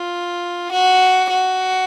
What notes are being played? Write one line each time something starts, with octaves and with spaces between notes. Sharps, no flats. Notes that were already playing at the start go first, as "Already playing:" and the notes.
Already playing: F4
F#4
F#4